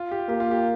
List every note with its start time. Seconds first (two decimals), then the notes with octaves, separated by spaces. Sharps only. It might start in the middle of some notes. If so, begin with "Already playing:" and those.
Already playing: F4
0.11 G4
0.29 A#3 G4
0.40 F4
0.51 G4